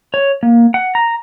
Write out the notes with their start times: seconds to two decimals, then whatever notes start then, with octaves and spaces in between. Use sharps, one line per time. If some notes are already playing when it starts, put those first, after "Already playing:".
0.14 C#5
0.43 A#3
0.74 F#5
0.95 A#5